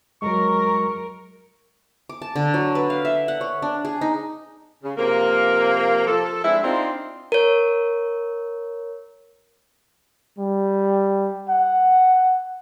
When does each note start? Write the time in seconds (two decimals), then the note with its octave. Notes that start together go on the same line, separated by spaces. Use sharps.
0.22 F#3 G#3 A#4 C#6
2.09 D6
2.22 A5
2.36 D3
2.54 F#3
2.75 B4
2.90 F5
3.05 E5
3.28 F#5
3.41 C#5
3.62 D4
3.85 G#4
4.01 D#4
4.84 C#3
4.97 C3 F3 A#3
6.07 F3 A4
6.45 G#3 C4 D4 E4
6.63 C4 D4 D#4 F4
7.32 A#4 C#5
10.38 G3
11.49 F#5